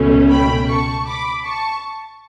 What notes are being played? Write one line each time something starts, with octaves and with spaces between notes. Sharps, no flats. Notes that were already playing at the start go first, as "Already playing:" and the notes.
Already playing: C#2 B2 A3 C#4
G5 B5
A5 C#6
B5 D6
A5 C#6